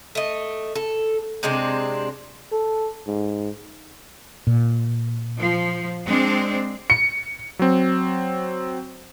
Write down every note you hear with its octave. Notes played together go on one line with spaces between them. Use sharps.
A3 D#5
A4
C3 G#3 C4 D4
A4
G#2
A#2
F3
G#3 C4 D4
C#7
F#3 C4